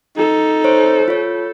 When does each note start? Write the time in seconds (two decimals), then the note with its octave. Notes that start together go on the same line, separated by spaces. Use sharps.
0.17 D#4 A4
0.64 C5 C#5
1.08 F4 C#5